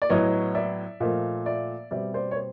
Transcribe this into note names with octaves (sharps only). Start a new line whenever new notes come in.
D5
A2 F#3 B3 C#5 D#5
D5 E5
A#2 F3 A3 D#5 F5
D5 E5
B2 G3 C4 D5 E5
C5 D5
C#5
C5